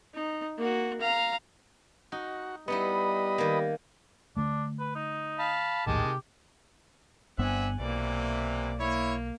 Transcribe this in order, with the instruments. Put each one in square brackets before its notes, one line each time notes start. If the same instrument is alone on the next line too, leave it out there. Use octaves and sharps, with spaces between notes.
[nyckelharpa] D#4
A#3 F#4
F5 A#5
[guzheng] D#4 [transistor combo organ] F#4
[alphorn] G3 [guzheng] B3 D#4 E4 [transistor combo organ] B4 D#5
[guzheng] D#3 A#3
[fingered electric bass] D3 A3 [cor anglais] D4
[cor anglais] B4
D#4
[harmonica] F5 A5 B5
[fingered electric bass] A#1 D#2 A2 [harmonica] D#3 G#3 A5 [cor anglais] G4
[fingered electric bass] C3
[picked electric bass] G1 G2 B3 [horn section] C4 D4 E5 [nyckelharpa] F#5 G#5
[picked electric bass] B1 [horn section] C3 E3 [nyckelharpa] A#3 D5
[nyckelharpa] A#3 [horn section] E4 C#5